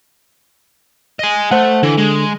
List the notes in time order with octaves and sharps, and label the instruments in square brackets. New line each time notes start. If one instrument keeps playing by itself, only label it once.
[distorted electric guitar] D#5 G#5
[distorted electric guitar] A3 [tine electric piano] C5 F#5
[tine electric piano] D3 [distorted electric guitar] E3
[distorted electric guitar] G#3